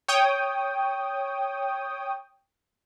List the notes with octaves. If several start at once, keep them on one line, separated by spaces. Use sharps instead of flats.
C#5 G5 D#6